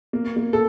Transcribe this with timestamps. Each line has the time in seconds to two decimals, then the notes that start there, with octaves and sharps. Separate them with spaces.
0.13 A#3
0.36 A#3
0.53 A4